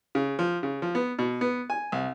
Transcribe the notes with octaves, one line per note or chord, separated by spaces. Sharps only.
C#3
F3
C#3
F3
B3
B2
B3
G#5
C2